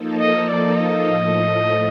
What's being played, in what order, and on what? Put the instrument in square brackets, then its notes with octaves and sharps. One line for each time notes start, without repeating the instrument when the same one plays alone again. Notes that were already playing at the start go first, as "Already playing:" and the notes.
Already playing: [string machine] F3 A#3 D#4 A4
[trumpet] D#5
D5
D#5
[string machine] A2 F3 A3